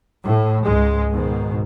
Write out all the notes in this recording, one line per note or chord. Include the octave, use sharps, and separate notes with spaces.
A2
C#2 G#2 G#3
G#2 B2 D#3